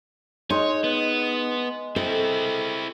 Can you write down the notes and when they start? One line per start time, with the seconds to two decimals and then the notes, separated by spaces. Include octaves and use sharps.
0.50 G#3 D#4 C#5 C6
0.84 B3
1.96 C4 E4 A4